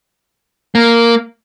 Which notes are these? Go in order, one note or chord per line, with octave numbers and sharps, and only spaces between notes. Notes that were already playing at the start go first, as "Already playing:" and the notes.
A#3